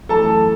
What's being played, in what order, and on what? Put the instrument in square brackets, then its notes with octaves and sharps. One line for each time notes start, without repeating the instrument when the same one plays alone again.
[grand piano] F#2 E3 A3 A4 A5